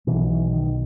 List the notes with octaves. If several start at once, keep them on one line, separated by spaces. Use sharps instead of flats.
B1 B2 E3
E3
D#3